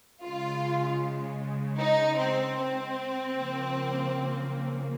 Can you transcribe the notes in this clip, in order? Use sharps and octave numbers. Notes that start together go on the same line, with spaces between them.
C#3 G#3 F4
D#4
C4
C4
C#3 F3 A#3